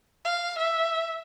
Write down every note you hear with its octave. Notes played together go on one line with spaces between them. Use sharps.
F5
E5